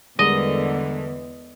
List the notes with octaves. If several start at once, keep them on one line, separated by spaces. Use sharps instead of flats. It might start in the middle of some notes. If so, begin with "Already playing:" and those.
E2 D3 E3 G3 G#3 A#4 D#5